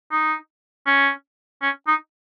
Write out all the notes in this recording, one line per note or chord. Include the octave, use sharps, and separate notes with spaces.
D#4
C#4
C#4
D#4